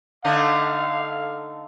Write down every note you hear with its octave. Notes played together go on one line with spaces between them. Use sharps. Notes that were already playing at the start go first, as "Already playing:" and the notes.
D3 A3 D#4 F5